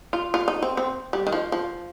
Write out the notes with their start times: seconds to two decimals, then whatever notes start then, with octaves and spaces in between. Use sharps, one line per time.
0.13 F4
0.34 F4
0.48 D#4
0.62 C4
0.77 C4
1.13 G3
1.27 D#3
1.32 F3
1.52 F3